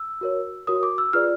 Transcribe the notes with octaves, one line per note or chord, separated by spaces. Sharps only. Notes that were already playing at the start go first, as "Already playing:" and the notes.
Already playing: E6
F#4 A#4 C#5
F#4 A#4 C#5 D#6
D6
E6
F4 G#4 B4 D5 F6